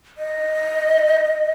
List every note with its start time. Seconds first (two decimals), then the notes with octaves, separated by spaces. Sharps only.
0.18 D#5